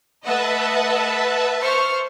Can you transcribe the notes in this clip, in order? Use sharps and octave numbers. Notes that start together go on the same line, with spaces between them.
A3 B4 D#5 E5 F#5 A5
C5 C#6 F6